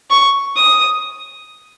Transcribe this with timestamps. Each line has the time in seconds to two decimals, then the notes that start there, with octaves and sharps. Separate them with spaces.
0.10 C#6
0.57 D#6